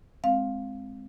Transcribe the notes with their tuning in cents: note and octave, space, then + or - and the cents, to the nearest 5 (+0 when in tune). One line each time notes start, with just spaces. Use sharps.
G#3 -5 C4 +0 F5 +0